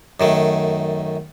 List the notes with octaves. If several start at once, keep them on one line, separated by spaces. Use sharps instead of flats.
F#2 D#3 A3